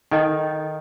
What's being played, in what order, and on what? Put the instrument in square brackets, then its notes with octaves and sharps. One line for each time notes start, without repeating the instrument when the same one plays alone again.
[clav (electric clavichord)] D#3 [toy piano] D#4 A4 D#5 G5